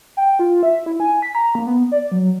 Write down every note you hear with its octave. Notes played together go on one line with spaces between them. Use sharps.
G5
F4
E5
E4
G#5
B6
A#5
A#3
B3
D5
F#3